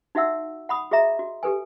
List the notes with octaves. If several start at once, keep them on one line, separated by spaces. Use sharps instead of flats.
D#4 F#4 E5 F#5 E6
F#5 B5 D#6
F#4 G#4 D#5 E5 A#5
F#4
G4 A4 B4 G#5